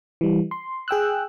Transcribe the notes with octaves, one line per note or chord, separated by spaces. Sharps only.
E3 G3
C6
G#4 G5 E6 F#6